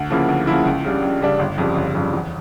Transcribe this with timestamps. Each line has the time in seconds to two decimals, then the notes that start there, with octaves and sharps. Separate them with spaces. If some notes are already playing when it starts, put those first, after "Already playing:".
Already playing: D2
0.10 C#3 F3 A#3 E4
0.29 D2
0.47 C#3 F3 A#3 E4
0.65 C#2
0.84 C#3 G3 D4
1.02 C#2
1.21 C#3 G3 D4
1.39 G1
1.58 F2 C#3 G3
1.76 G1
1.95 F2 C#3 G3
2.13 E2